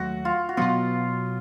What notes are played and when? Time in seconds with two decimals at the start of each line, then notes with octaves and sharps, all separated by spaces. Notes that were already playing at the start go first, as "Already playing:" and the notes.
Already playing: D#2 F#3 A3 F#4
0.25 F4
0.49 F#4
0.57 B2 F#3 B3 F4